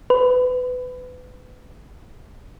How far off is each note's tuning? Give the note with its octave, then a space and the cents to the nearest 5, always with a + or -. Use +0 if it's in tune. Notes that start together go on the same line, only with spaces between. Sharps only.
B4 +25